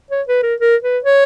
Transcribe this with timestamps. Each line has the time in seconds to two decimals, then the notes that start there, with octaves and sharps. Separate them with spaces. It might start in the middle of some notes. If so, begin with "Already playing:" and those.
0.11 C#5
0.28 B4
0.43 A#4
0.60 A#4
0.83 B4
1.05 C#5